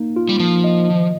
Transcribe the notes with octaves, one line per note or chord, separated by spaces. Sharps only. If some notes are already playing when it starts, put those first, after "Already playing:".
Already playing: A#3 D#4
F4
G3
F3 A#3
D#5
D#3